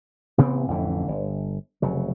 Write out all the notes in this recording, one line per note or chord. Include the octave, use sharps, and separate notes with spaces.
A1 C3 B3 C4
A1 F2 D3 E3
G1
F1 C#3 F#3